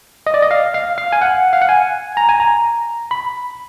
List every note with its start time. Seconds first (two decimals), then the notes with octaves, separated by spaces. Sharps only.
0.27 D#5
0.34 D5
0.42 D#5
0.51 F5
0.74 F5
0.98 F5
1.12 G#5
1.21 F#5
1.53 F5
1.62 F#5
1.69 G#5
2.17 A#5
2.29 G#5
2.40 A#5
3.11 B5